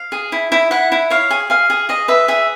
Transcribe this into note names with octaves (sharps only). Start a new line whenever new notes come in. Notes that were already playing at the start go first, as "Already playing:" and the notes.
Already playing: F5
G#4
E4
E4
E4 F#5
E4
C#5 F5
G#4
G#4 F5
G#4
G#4 D#5
B4 E5
G#4 E5